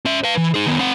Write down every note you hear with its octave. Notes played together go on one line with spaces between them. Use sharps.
C#4 E5
B4 F5
E3
D#4 G#4
D#3 B3
C4 F#5